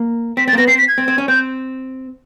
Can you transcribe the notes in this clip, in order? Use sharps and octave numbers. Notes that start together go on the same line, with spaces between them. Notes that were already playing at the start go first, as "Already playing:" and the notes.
Already playing: A#3
C4 B6
C4 A6
A#3
B3 A#6
C4 C7
B6
G#6
C4
C4
C#4
C4 G6